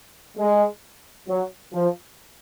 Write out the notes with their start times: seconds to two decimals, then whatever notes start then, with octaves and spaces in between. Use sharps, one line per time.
0.38 G#3
1.28 F#3
1.73 F3